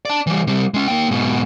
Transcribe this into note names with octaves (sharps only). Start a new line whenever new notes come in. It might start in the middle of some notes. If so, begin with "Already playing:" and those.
D5 A5
E3 G3
C3 G3
G#3 C#4
A#3 G5
G#2 B2